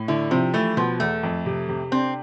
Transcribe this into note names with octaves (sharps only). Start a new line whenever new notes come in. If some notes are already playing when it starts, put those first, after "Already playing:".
Already playing: A2
D3 E4
C3 F3
E3 A3
B2 F3
E2 A3
F2
C3
C3
C4 D4